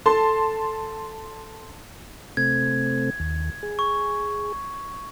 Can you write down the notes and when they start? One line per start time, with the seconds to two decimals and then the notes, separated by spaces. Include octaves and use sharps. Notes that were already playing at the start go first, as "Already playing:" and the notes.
0.06 A4 A5 C6
2.37 C3 A3 C4 G#6
3.20 D#2
3.63 G#4
3.79 C#6